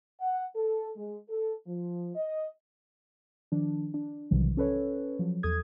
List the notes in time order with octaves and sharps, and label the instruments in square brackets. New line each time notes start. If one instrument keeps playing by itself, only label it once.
[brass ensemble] F#5
A4
G#3
A4
F3
D#5
[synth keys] D#3 F3 D4
D4
B1 C3 D#3 E3 F#3 G3
C#4 A4 B4 C#5
F3 F#3
E2 A4 D#6 G#6